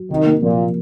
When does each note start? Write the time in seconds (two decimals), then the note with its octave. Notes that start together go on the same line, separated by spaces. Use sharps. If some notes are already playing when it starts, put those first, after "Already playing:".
Already playing: F#3
0.10 C3 D#3
0.26 A#3
0.42 A#2 F3